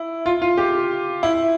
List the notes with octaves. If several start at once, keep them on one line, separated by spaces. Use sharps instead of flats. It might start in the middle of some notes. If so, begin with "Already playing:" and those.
Already playing: E4
F4
F4
G4
E4